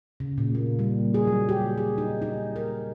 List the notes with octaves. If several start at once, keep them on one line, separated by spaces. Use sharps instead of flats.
C#3
A#2
A#3
G3
G#4
F#3
G4
G#4
D#4
D#4
A#4